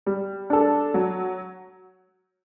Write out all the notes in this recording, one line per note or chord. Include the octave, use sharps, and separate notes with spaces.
G3
D4 A4
F#3